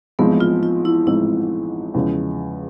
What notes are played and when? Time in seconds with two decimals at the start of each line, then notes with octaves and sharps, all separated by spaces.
0.19 A1 G#2 F3 G#3 B3 C4
0.40 F4
0.63 F4
0.85 E4
1.07 A1 G#2 F3 G#3 C4 E4
1.94 E2 C#3 F3 G#3 C#4